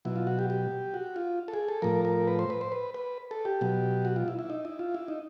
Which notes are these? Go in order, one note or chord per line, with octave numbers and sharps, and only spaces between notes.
B2 F#3 E4
F4
F#4
G4
G4
F#4
F4
A4
G#4
A4
A2 F3 A#4
A#4
B4
C5
B4
C5
B4
B4
A4
G4
B2 F#3
F#4
F4
E4
E4
D#4
E4
F4
E4
D#4